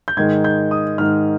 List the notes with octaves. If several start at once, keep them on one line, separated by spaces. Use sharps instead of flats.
G6
G#2 D#3 G#3 G#6
G6
D#6
G#2 D#3 G#3 F6